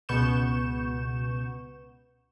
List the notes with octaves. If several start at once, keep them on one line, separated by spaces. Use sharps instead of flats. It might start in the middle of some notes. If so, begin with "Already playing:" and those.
C#2 B2 B3 C#6 G6 E7